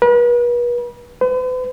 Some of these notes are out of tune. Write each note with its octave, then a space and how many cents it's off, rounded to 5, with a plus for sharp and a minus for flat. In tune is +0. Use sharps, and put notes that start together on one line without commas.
B4 -40
B4 +45